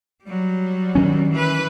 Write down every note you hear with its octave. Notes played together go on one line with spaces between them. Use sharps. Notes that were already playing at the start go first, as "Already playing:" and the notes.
F#3 G3
D#3 C#4
E3 B4